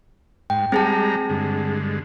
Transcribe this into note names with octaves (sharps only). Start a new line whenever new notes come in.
G#2 G5
G3 G#3 C4 G#4 A5 A#5
G2 D3 G#3